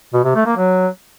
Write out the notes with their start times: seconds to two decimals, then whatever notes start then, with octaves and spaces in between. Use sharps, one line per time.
0.13 B2
0.24 C3
0.35 A3
0.46 A#3
0.57 F#3